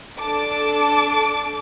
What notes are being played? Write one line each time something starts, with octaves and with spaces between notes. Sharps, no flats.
D4 A4 A5 D6